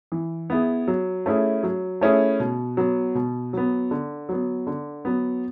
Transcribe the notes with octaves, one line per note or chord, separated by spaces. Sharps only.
E3
B3 E4 G#4
F#3
A3 C#4 E4 G#4
F#3
A3 C#4 E4 G#4
B2
F#3 B3
B2
F#3 B3
D3
F#3 B3
D3
F#3 B3